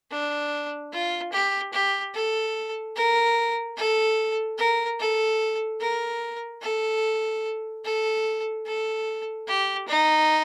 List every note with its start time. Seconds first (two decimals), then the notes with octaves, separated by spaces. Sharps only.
0.11 D4
0.93 F4
1.33 G4
1.73 G4
2.14 A4
2.96 A#4
3.77 A4
4.58 A#4
5.00 A4
5.81 A#4
6.62 A4
7.85 A4
8.66 A4
9.48 G4
9.88 D#4